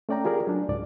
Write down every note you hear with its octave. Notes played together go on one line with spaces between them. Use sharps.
A3 C#4 D5 G5 A#5
F4 G4 G#4 A#4 D5
F#3 D4
C#2 G#2 D5